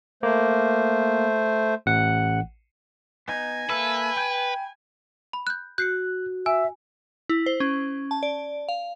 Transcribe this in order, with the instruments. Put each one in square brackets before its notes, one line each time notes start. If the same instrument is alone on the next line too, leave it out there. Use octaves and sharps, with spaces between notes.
[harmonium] A3 C5 [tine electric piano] A#3
[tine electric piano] A1 F#5
[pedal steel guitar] B3 D#4 [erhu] G#5
[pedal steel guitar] A#3 A4 E5 [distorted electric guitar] B4
[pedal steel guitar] G5 B5 G6
[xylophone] B5
F#6 G6
[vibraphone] F#4 [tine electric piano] F#6 [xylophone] G6 C7 C#7
[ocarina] E5 [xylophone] G#5 [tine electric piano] E6
[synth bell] E4
C5
C#4
A5
D5
F5